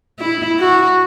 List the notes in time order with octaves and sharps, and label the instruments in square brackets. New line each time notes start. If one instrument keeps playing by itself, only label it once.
[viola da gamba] E4
F#4